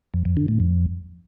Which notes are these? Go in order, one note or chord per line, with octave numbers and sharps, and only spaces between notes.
F2
F2
D3
A2
F2